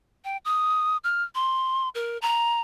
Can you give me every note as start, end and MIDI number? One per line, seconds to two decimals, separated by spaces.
0.25 0.37 79
0.45 0.97 87
1.04 1.23 89
1.35 1.89 84
1.95 2.18 70
2.22 2.62 82